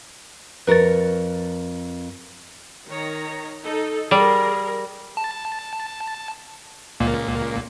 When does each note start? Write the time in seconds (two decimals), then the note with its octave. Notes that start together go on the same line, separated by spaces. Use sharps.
0.67 F2 A#4 B4 C#5 A6
2.88 D#3 C#5 A#5
3.64 D#4 A4
4.11 G3 G#4 A#4
5.17 A5
7.00 C#2 A#2 A#3